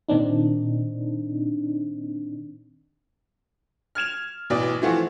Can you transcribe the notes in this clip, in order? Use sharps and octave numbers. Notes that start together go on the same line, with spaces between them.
A#2 D#3 C4 D4 D#4
F6 G#6 E7 F7
A1 B2 E3 D5
E3 F3 A3 C4 F4 F#4